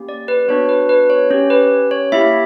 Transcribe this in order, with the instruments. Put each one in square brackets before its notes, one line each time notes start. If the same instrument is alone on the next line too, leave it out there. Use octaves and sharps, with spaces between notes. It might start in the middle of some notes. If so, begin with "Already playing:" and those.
Already playing: [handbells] A#3 C#4 G4
D5
B4
B3 D4 F#4 C#5
B4
B4
C#5
C#4 G4 C#5
B4
C#5
A#3 E4 G4 E5